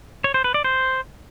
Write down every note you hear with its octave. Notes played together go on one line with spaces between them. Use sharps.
C#5
C5
B4
D5
C5